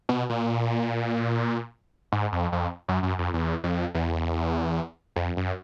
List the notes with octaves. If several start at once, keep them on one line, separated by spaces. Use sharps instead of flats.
B2
A#2
G#2
F2
F2
F#2
F#2
F2
E2
F2
E2
F2
F#2